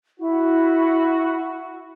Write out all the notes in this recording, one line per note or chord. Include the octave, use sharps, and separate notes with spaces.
E4 F#4